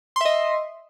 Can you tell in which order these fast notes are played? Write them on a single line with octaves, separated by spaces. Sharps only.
C6 E5 D#5